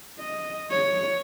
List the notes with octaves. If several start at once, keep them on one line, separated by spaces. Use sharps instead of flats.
D#5
C#5